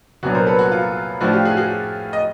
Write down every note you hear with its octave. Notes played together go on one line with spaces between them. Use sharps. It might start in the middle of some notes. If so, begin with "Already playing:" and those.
C2 A#2 F#3 B3 D4 F#4
A#4 C5
A4 B4
F#4
F4
A2 F3 A3 D4 F#4
F4 G4
F#4 G#4
F#4 G#4
D#5